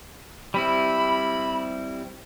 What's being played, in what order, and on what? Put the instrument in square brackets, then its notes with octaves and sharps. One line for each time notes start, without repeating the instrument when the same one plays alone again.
[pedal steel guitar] G3 C4 E4 [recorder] B5